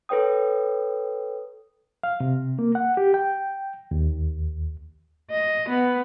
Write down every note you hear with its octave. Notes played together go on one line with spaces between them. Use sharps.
A4 B4 C#5 G5 D#6
F5
C3
A#3
F#5
G4
G5
D#2
D#5
B3